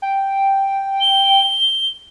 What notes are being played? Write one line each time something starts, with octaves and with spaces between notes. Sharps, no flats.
G5
G7